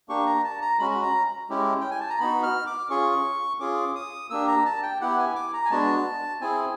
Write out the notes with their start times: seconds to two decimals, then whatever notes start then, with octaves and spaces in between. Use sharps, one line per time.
0.09 A#3 D4 G4 C#6
0.26 A#5
0.44 A5
0.61 A#5
0.79 G#3 C#4 F#4 B5
0.91 B5
1.02 A#5
1.50 G#3 C#4 E4 G4
1.81 G5
1.90 G#5
2.00 A5
2.10 A#5
2.20 B3 D#4 F#4 B5
2.43 F6
2.67 D6
2.90 C#4 F4 G#4 C#6
3.60 C#4 F4 G#4 D6
3.95 D#6
4.30 A#3 D4 G4 E6
4.48 A#5
4.65 A5
4.83 G5
5.01 B3 E4 G4 F#5
5.18 G#5
5.36 D6
5.53 A#5
5.65 G#5
5.71 G#3 B3 D4 F#4 A5
6.41 C4 E4 G#4 G#5